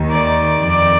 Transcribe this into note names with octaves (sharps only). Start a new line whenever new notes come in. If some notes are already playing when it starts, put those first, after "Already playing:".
Already playing: D#2 D#3
D5
F2 D#3 D5